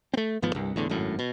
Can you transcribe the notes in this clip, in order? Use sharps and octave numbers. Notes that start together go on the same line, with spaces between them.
A3 C4
A1 G#2 F3 B3
C2 G2
E2 A2 D3
G#1 F#2 A2
B2